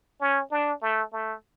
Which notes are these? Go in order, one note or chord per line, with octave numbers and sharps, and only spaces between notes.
C#4
D4
A3
A3